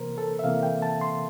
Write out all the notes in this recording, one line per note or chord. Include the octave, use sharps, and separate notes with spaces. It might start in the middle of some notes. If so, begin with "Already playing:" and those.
Already playing: C3 E3 A#3 A#4 C5
A4
E5
C3 E3 A#3 F5
G5
A5
C6